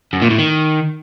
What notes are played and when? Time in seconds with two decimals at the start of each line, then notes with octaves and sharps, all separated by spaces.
0.13 F#2
0.22 A#2
0.30 A2
0.39 D#3